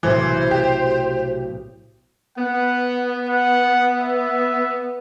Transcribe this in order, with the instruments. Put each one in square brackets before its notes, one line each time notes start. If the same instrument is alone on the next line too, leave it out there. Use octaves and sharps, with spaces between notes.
[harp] B1 A2 C3 [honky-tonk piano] E3 [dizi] C5
[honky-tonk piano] G4
[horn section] B3 [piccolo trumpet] F#5
[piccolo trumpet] F#5
E5